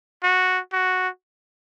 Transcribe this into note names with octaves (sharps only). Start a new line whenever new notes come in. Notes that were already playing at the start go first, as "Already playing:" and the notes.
F#4
F#4